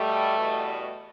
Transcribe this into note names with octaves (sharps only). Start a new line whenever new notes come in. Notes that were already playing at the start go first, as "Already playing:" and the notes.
Already playing: B2 G3 A3
E2 B2 G3